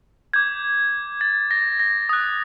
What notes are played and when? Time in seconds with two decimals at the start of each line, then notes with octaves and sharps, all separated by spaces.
0.33 D6 G6 G#6
1.21 A6
1.51 A#6
1.80 A#6
2.09 D#6 F#6